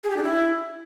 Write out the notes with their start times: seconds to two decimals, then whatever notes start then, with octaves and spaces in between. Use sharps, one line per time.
0.04 G#4
0.10 G4
0.17 D4
0.23 E4